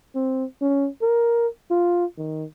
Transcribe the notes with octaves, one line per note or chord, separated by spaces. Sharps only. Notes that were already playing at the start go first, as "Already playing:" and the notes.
C4
C#4
A#4
F4
D#3